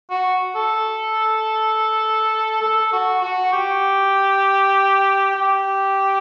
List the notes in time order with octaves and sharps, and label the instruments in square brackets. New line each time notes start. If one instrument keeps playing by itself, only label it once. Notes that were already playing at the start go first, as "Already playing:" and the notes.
[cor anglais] F#4
A4
A4
F#4
F#4
G4
G4